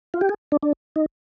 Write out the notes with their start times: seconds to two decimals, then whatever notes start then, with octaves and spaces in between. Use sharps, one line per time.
0.14 F4
0.21 G4
0.29 G#4
0.52 D4
0.63 D4
0.96 D#4